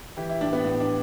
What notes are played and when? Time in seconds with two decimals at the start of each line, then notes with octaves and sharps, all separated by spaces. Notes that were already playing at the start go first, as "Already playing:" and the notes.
0.17 E3 G4
0.29 E4
0.41 A2 D4
0.53 B3
0.65 A2
0.80 D4